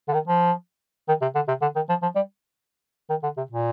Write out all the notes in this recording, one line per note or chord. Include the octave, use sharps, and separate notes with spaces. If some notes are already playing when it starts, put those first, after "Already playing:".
D3
D#3
F3
D#3
C3
D3
C3
D3
D#3
F3
F3
G3
D#3
D3
C3
A#2